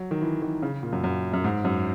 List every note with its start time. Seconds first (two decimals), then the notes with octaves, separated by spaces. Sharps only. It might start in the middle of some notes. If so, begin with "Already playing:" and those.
Already playing: F#3
0.11 D#3
0.21 E3
0.42 D#3
0.62 C#3
0.83 A#2
0.93 F#2
1.04 F#2
1.33 F#2
1.44 G#2
1.65 F#2